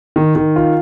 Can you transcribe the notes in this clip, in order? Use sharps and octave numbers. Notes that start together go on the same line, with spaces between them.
D#3
D#3
F4